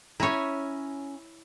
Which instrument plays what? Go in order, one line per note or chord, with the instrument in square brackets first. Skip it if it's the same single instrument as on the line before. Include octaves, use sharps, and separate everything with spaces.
[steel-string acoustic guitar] C#4 G#5 A#5 [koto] E4 C#5